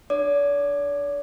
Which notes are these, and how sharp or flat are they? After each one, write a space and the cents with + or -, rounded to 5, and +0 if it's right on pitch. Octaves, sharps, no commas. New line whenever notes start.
D4 +20 D5 -45 D6 +30